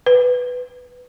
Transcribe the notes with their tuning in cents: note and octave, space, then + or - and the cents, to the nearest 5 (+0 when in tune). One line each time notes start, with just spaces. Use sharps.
B4 +5